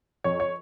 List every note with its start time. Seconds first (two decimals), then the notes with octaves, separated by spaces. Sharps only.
0.24 F2 C#5
0.40 C#5